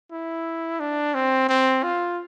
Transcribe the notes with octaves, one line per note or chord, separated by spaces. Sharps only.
E4
D4
C4
C4
F4